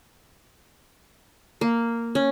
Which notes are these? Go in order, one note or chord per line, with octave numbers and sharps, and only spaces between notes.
A#3
C#4